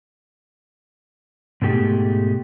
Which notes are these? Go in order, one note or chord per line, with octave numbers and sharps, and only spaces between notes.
G#2 B2 A3 G4 G#4